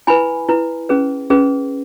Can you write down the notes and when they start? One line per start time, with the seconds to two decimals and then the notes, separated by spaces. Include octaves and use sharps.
0.07 E4 B4 G#5 B5
0.49 E4 B4
0.89 C#4 G#4 B4
1.30 C#4 G#4 B4